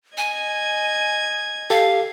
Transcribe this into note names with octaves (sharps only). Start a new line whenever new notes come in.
D#5 G#5 G#6
G4 A4 F5